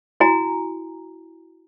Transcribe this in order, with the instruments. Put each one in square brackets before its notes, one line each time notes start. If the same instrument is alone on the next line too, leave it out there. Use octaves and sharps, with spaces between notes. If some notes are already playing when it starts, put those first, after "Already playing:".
[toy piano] E4 F#4 G#5 A#5